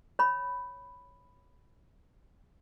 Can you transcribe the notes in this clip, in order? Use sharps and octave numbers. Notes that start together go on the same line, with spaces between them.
C#5 B5